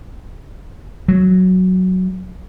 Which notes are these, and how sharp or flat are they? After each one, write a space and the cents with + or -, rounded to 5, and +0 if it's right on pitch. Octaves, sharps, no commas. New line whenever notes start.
F#3 +0